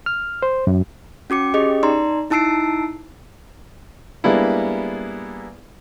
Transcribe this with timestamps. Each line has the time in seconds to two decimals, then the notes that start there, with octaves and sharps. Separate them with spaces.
0.06 F6
0.42 C5
0.67 F#2
1.30 C#4 F#4 D6 C#7
1.54 C#4 G4 G#4 D#5
1.83 D#4 D5 A#5 C6
2.30 D#4 E4 A5 E6 C7 D7
4.24 G3 G#3 A#3 B3 D4 E4